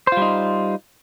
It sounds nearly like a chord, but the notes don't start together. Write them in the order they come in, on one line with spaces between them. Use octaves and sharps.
C5 F4 G3 D#4